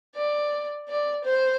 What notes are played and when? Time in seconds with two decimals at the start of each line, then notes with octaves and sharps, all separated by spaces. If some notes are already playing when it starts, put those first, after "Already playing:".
0.16 D5
0.88 D5
1.24 C5